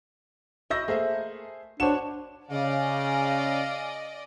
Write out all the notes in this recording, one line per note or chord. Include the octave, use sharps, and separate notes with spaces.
E4 F#4 D#5 E5 E6 G6 A#6
A3 A#3 G#4 C5 E5
D4 F#4 C5 C#5 F#5 E7
C#3 D5 D#5 F5 G#5